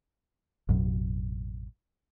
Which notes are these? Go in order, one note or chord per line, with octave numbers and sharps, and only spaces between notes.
A1 F2 B2 F#3